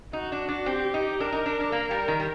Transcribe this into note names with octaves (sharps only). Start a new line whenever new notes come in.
D#4 F#4
D4
D4
C4 G4
D#4
D4 A#4
D#4
D4
D4
A#3 A#4
G3
D#3
G3